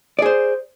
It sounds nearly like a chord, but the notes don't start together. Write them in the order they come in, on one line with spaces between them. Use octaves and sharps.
D5 G#4 C5